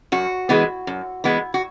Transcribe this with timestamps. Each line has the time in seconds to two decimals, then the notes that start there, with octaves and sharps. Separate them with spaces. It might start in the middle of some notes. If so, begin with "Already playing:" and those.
0.12 F#2 F#4
0.49 E3 G#3 B3
0.87 F#2
1.24 E3 G#3 B3
1.54 F#4